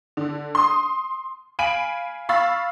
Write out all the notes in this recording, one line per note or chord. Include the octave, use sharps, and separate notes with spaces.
D3
C6 D#6
F5 G#5 B5 D7 D#7 F#7
F5 B5 C#6 E6 A6